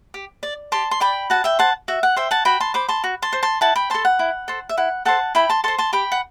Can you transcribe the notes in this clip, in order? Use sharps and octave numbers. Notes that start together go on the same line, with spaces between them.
G4
D5
G4 A5 C6
C6
D5 G5 B5
F#4 F#5 A5
E5 G5
C5 F#5 A5
F#4 E5
F#5
C5 E5 G5
F#5 A5
F#4 G5 B5
A5 C6
C5 B5 D6
A5 C6
F#4
A5 C6
C5
A5 C6
E4 F#5 A5
G5 B5
A4 C5 A5 C6
F#5
E4
A4 C5
E5
E4 F#5
A4 C5 F#5 A5
E4 G5 B5
A5 C6
A4 C5 A5 C6
A5 C6
G4 G5 B5
F#5